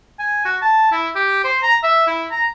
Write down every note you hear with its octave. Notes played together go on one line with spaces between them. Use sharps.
G#5
F#4
A5
E4
G4
C5
A#5
E5
E4
A#5